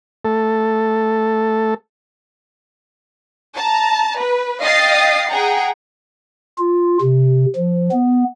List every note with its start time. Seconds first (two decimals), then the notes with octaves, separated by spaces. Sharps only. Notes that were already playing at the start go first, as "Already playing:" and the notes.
0.25 A3 A4
3.55 A5 A#5
4.18 B4
4.61 D#5 F5 G5 D#6 A6 C7
5.28 G#4 F#5 G5 A#5
6.58 F4
7.02 C3
7.56 F3
7.92 B3